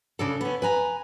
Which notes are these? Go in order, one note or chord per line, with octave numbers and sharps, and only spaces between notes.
C#3 D4 A4
B3 C#4
B4 G#5 A#5